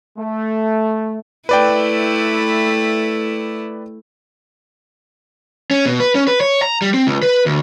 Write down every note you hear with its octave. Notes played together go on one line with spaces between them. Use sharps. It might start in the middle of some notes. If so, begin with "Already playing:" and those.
A3
A3 E4 B4 D5 G5
C#4
B2
B4
C#4
B4
C#5
A#5
G3
C4
C#2
B4
D2